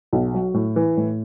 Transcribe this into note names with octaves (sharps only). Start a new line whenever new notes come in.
B1
F#3
A2
E3
A2